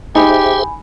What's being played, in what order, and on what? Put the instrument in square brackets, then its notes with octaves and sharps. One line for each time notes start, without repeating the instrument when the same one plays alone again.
[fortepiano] D#4 [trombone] G4 [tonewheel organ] G#4 C5 E5 [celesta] G#5 B5